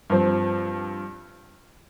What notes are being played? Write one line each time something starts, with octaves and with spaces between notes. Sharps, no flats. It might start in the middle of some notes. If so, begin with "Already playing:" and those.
G2 F3 C4